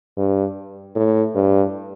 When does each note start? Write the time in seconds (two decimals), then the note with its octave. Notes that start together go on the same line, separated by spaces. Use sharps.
0.17 G2
0.95 A2
1.35 G2